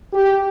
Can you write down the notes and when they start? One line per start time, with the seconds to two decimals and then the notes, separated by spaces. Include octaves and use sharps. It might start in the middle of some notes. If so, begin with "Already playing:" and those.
0.14 G4